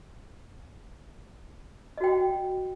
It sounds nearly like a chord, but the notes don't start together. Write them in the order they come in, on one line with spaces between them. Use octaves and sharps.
D#5 F#4 G5